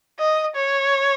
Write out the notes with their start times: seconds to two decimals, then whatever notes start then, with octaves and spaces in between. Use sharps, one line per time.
0.19 D#5
0.56 C#5